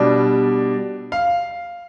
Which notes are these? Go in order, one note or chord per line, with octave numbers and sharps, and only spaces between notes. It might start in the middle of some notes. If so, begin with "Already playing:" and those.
Already playing: B2 G3 D4
F5